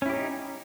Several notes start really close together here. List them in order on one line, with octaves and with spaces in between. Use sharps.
C#4 E4 G4 D#4